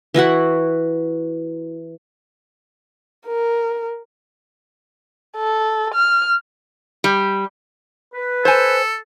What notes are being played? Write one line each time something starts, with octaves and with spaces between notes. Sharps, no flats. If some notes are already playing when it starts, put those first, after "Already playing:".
E3 E4 F#4 F#5
A#4
A4
F6
G3
B4
A4 C5 G#5